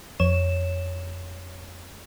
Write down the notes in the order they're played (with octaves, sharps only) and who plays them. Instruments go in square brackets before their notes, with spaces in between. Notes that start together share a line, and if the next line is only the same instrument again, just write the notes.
[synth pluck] F2 C#5 E7